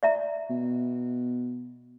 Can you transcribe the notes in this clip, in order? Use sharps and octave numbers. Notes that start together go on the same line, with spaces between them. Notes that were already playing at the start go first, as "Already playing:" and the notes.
D5 E5 A#5
B2